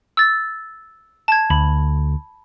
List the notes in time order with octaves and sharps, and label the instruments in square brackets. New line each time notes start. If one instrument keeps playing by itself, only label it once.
[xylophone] E6 A6
A5 G#6
[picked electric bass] D2 [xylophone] B5